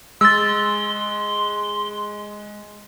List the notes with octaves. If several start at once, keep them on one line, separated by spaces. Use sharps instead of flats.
G#3 C6 E6 A6